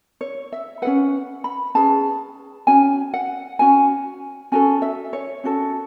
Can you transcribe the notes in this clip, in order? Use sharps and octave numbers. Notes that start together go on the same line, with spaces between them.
C#5
E5
C#4 G#4 B4 F#5
B5
C#4 G#4 B4 A5
C#4 F#4 G#5
F#5
C#4 F#4 G#5
C#4 F#4 A4 G#5
E5
C#5
C#4 F#4 A4